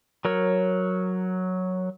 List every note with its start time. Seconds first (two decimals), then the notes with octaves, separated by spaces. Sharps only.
0.25 F#3 A#4 C#5